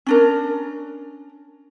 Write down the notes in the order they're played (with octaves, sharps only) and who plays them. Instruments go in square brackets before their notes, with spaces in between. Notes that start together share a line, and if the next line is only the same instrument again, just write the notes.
[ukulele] C#4 D4 A#4